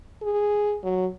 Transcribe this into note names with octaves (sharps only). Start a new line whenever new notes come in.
G#4
F#3